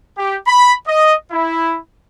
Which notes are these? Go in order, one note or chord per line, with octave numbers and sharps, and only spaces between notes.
G4
B5
D#5
E4